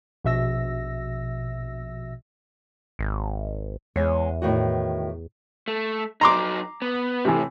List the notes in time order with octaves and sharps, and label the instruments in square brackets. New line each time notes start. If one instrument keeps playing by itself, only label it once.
[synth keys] A#1 B2 E5 E6 A#6
[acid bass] G#1
[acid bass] E2 [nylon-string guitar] G#3 C#5
[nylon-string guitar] A2 D#3 F#4
[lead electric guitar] A3
[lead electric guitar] F#3 D#4 [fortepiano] A#5 C6 D6
[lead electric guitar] B3
[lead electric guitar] A2 [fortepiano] C3 E3